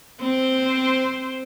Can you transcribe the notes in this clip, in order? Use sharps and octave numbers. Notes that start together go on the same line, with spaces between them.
C4 C5